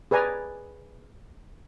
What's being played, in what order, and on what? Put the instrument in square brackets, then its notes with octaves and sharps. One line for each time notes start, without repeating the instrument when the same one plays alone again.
[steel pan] G#4 B4 D5 G#5 A#5